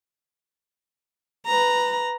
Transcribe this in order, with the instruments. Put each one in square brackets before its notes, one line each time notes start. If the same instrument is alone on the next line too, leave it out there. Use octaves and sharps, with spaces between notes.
[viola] B4 A#5